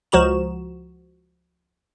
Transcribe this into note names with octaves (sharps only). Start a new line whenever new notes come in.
C#2 F3 F#4 A#5 E7